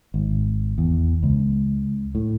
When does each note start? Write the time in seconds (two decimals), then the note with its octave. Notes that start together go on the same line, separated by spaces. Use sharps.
0.14 G#1
0.78 E2
1.23 C#2
2.15 A2